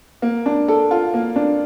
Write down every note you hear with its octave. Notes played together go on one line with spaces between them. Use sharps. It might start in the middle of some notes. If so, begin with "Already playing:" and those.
A#3
D4
A4
F4
A#3
D4